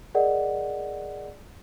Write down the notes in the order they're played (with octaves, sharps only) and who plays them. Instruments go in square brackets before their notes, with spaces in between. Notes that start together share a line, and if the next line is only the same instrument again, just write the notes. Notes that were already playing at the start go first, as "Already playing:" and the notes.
[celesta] G#4 A#4 D5 D#5 F#5